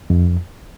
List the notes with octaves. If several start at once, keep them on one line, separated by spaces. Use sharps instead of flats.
F2